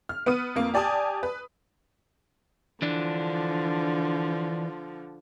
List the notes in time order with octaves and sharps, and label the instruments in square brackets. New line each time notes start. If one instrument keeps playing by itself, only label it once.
[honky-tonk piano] F6
B3 B4 D#6 D#7
F2 A#3
G4 D5 G#5 A5 D#6
B4
[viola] D3 F3 [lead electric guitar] E3 D4